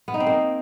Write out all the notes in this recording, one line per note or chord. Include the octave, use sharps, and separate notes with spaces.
B3
D#4
C4
A#3